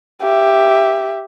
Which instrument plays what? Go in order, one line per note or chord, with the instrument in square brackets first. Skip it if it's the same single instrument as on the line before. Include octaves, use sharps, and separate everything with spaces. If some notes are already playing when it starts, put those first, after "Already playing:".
[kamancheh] G4 E5